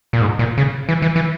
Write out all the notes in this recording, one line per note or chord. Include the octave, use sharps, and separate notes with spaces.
A#2
G#2
A#2
C#3
E3
E3
E3